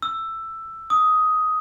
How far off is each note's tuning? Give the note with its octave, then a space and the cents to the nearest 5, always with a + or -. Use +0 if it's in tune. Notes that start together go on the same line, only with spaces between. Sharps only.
E6 +10
D#6 +10